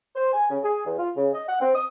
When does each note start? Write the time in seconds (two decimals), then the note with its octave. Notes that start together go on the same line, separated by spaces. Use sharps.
0.16 C5
0.33 G#5
0.50 C#3
0.64 G#4
0.86 E2
0.99 F4
1.17 C#3
1.34 D#5
1.49 F#5
1.61 C4
1.75 D#6